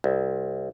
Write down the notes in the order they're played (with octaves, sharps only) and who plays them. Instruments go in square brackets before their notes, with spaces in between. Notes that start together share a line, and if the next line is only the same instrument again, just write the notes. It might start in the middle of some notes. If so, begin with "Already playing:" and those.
[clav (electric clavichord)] C2